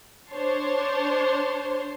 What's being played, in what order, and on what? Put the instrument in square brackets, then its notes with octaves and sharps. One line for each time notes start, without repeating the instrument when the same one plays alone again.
[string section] D4 C5 C#5 A5 C6